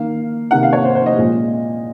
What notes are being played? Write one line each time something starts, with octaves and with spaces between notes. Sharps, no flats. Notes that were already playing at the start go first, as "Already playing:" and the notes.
Already playing: D#3 A#3 F5
C3 D#3 A#3 F#5
F5
C#5
C5
C5
D#5
A#2 F3 G#3